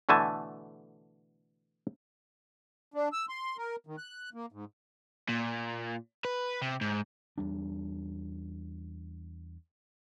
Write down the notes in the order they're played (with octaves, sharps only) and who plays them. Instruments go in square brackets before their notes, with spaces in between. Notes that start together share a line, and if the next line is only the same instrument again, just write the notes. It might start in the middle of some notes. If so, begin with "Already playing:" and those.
[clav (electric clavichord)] B2 D3 E3 A3 G#5 A5
[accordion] D4
E6
C6
A#4
D#3
F#6
A#3
G#2
[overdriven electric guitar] A#2
B4
C3
G#2
[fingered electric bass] E2 G3 D4